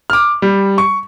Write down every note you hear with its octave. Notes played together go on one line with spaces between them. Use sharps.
D6 F6
G3
C#6